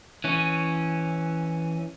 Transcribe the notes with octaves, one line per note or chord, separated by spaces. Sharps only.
E3 C#4